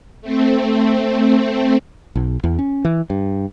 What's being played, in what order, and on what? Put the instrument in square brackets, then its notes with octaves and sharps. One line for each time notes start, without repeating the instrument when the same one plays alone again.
[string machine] A3 C4
[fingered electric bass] B1
E2
C#4
E3
G2